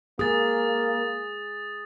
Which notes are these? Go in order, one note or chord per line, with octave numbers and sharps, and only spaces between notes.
A#3 G#4 D#6 A6